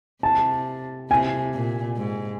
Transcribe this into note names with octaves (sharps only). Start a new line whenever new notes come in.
C3 A5
C3 G#5
A#2
G#2